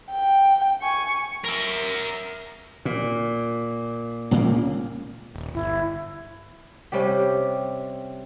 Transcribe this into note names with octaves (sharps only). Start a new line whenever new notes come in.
G5
G#5 C#6
A#4 E5
A#2
C#2 A#2 C#3 A#3
D#1
G1 E4
C3 G3 C#4 G4